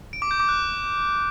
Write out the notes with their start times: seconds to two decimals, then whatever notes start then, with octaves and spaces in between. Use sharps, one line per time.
0.13 D7
0.22 D6
0.31 G6
0.40 D6
0.49 F#6